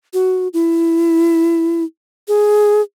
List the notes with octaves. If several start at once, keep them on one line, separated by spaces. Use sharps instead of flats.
F#4
E4
G#4